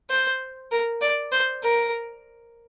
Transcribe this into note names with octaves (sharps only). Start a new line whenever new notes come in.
C5
A#4
D5
C5
A#4